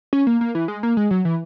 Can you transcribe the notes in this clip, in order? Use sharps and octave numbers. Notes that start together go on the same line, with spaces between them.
C#4
A#3
A#3
E3
G#3
A#3
G#3
F#3
E3